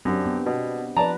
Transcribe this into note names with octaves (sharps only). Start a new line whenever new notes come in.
F#2 C4 D4 G4
B3
B2
F3 B4 D5 A5 A#5